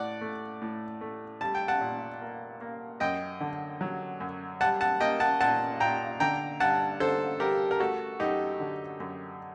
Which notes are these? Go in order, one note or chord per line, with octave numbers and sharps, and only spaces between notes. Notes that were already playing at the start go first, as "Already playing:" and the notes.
Already playing: A2 D5 F#5
A3
A2
A3
G3 A5
G5
F#5 A5
A#2
A#3
A#3
F#2 D#5 G5
D3
F#3
F#2
G3 F#5 A5
F#5 A5
A#3 D#5 G5
F#5 A5
A#2 F#5 A5
A#2 G5 A#5
D3 G5 A#5
G2 F#5 A5
D3 A4 C5
G3 G4 A#4
A#4
A3 F#4 A4
F#2 D#4 G4
D3
F#2